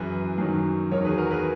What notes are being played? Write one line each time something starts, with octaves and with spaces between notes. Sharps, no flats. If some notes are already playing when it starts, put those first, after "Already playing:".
Already playing: F#2 E3 G#4 B4
F#2 D#3 F#3
E2 D#3 F#3 A#4 C#5
G#4 B4
F#4 A#4
G#4 B4